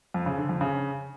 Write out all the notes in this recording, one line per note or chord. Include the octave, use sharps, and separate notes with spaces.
F2
C#3
D3
F2
C#3